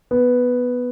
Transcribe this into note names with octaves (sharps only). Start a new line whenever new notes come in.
B3